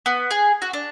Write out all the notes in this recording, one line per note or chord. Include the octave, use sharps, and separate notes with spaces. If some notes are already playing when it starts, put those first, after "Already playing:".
B3
G#4
F#4
D4